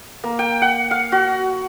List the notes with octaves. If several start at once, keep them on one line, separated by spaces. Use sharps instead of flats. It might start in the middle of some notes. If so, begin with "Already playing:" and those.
A#3
G5
F#5
F5
F#4